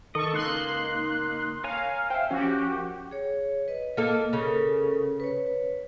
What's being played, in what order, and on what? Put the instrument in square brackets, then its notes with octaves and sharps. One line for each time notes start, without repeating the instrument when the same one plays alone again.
[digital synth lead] D#3 [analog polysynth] A4 C#6 [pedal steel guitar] D#5
[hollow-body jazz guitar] C#2 [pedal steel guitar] A#3 [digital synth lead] D#4 [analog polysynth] C6 F#6
[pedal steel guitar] A#4 G#5 A#5 [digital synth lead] C#5 [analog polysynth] F5
[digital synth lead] C5 [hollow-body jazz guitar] E5 G5
[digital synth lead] F3 [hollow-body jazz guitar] C#4 [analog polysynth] F#4 G4
[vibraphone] G#4 C#5
B4 D#5
[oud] A#3 A4 [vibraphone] D#5
[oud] C#3 [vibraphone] A4 A#4
[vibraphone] B4 C#5